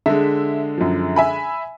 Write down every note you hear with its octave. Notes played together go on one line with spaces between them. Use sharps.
D3 G#3 E5
F#2 F3
E5 G#5 B5